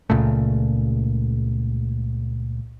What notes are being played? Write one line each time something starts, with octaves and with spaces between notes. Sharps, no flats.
C#2 A#2 C#3 A3